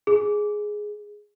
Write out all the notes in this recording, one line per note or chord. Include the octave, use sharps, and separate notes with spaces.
G#4